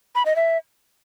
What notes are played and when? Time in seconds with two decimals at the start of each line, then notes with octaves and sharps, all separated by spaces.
0.15 B5
0.26 D#5
0.36 E5